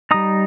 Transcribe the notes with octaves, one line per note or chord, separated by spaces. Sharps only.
G3 D#4 A#5 D#6